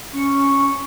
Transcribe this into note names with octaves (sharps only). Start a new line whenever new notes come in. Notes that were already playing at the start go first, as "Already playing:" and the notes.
C#4 C#6